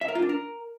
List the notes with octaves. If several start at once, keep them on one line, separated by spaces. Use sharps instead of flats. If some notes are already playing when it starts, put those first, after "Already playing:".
E5
A#4
F4
D4
A#4